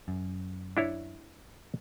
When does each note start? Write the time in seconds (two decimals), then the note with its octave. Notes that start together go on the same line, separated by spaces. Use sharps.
0.08 F#2
0.77 D4 E4 C#5